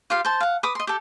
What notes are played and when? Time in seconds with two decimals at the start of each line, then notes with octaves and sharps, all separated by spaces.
0.10 F4 G4 F5
0.25 C5 A5
0.40 F5 F#5
0.63 B4 D6 D#6
0.75 D#5 C6
0.87 G4 A4